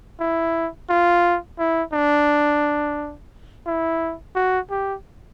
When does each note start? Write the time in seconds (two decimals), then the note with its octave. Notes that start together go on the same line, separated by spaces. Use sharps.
0.20 E4
0.90 F4
1.59 E4
1.93 D4
3.66 E4
4.36 F#4
4.70 G4